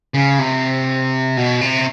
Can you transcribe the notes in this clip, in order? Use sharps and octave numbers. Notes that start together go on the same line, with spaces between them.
C#3
C3
B2
C3